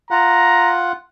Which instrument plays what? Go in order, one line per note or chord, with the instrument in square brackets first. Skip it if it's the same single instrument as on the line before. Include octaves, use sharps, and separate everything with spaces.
[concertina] F4 F#5 [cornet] A#5